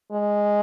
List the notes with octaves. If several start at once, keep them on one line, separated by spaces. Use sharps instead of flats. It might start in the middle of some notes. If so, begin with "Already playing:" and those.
G#3